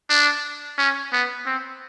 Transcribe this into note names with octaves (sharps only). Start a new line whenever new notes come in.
D4
C#4
B3
C4